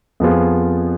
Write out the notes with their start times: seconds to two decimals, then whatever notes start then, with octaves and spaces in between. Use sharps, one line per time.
0.20 F2 F3 B3 F4 G#4